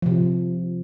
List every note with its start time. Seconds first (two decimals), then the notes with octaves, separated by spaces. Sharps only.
0.02 C3 F3